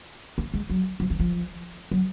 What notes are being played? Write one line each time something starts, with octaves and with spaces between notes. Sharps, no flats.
A#3
G#3
F#3
F3
D#3
F3
F#3